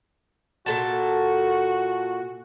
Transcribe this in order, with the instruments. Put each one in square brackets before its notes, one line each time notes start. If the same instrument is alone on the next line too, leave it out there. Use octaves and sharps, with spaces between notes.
[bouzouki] A#2 A4 A5 [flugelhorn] F#4